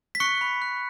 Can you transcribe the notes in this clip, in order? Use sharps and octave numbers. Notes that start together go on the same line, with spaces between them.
B6
C#6 F#6 C#7
B5
F#6